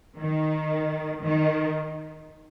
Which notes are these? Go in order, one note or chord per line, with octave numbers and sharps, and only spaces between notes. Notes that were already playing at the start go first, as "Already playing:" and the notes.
D#3
D#3